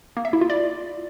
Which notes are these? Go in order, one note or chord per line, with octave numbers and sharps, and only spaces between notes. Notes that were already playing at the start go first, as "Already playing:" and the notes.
A#3
E5
E4
F4
D5